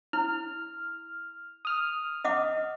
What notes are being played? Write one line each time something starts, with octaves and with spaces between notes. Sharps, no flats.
E4 F6
D#6 F6
D#5 F#5 D6